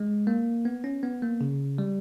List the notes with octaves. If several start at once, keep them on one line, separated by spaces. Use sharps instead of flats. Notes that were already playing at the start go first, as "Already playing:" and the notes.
Already playing: G#3
A#3
B3
C#4
B3
A#3
C#3
G3